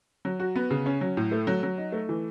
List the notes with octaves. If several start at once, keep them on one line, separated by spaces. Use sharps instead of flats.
F#3
F#4
B3
C#3
C#4
F#3
A2
A3
F#3
F#3
D#4
A3
E3